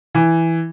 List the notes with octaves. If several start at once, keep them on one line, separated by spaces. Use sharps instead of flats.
E3